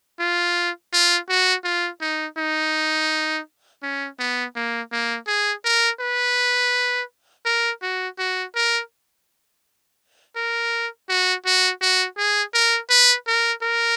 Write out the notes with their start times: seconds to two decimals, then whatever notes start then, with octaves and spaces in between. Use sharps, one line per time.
0.20 F4
0.93 F4
1.29 F#4
1.64 F4
2.01 D#4
2.38 D#4
3.83 C#4
4.19 B3
4.56 A#3
4.92 A#3
5.27 G#4
5.65 A#4
6.00 B4
7.45 A#4
7.82 F#4
8.19 F#4
8.55 A#4
10.36 A#4
11.09 F#4
11.46 F#4
11.81 F#4
12.17 G#4
12.54 A#4
12.90 B4
13.27 A#4
13.63 A#4